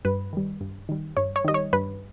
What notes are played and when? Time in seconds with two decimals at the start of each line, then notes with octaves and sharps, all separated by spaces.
0.05 G2 B4
0.33 D#3 G3
0.61 G2
0.89 D#3 G3
1.17 G2 C#5
1.36 C#5
1.44 D#3 G3 D#5
1.54 C#5
1.73 G2 B4